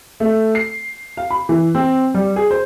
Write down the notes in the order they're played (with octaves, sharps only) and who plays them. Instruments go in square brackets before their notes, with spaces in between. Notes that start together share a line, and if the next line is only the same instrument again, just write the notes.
[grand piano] A3
C7
F5
B5
E3
C4
G3
G#4
C5